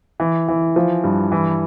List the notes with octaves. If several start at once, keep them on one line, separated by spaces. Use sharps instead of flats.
E3
E3
F3
G2
E3